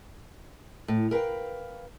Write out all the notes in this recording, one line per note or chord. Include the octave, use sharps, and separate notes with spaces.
A2
A#4 B4 F5 G5